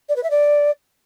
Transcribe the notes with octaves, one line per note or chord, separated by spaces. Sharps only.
D5
B4
E5
D5